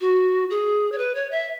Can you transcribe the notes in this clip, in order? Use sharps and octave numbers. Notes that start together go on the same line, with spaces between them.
F#4
G#4
C#5
B4
C#5
E5